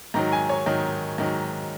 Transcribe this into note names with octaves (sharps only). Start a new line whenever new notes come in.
G#2 D#3 F#3 A#5
G#5
C#5
G#2 D#3 F#3
G#2 D#3 F#3